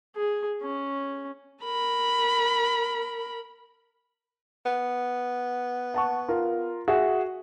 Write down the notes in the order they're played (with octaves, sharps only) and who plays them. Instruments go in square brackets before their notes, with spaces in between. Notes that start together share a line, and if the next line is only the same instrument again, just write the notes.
[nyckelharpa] G#4
C#4
[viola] A#4 B5
[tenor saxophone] B3
[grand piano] F#5 A5 C#6
F4 A#4
F#4 G#4 E5